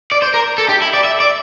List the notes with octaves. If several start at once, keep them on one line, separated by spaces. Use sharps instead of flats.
D5
C5
A#4
A4
G4
E4
D5
E5
D5